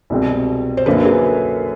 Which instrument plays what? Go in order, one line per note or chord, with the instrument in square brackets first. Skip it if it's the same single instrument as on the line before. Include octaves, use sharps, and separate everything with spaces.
[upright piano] C2 B2 G#3 C4
[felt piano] C5
[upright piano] F#2 D3 F#3 A#3 [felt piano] A4 B4
[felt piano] G#4